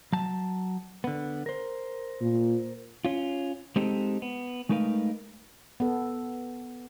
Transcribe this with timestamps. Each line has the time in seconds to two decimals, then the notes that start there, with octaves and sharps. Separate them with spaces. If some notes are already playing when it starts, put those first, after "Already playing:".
0.13 F#3 A5
1.04 D3 B3
1.46 A#4 C5
2.21 A#2
3.05 C#4 F4
3.76 G#3 C4 D#4 G4 A4
4.22 B3
4.69 G#3 A3 D#4 A#4 B4 F5
5.80 B3 A4